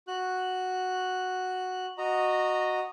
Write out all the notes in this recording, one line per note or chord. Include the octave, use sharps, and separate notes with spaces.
F#4 F#6
F#4 D#5 A#5